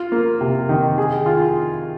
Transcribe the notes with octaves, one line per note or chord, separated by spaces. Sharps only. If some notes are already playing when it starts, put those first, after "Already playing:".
Already playing: F4
A#3
C3
D#3
G#4
F4